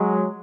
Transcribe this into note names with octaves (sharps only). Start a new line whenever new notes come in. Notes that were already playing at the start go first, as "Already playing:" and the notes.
Already playing: F#3 G#3